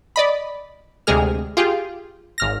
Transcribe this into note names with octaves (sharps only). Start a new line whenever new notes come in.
D5 D#5 B5
D2 C3 G#3 G#4 F6
F4 G4 G#4
G#1 F6 A#6